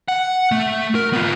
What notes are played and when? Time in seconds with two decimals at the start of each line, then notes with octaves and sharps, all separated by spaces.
0.08 F#5
0.52 A3
0.95 A#4
1.13 B3 F4